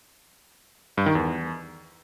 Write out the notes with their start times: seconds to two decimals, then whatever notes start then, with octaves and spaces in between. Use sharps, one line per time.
0.98 G2
1.06 D#3
1.15 E2